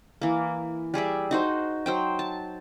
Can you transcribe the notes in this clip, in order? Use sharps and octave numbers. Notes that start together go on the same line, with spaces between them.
E3 A#3
G3 G#4 D5 E5
D#4 F#4 C5
F#3 C5 G5
A5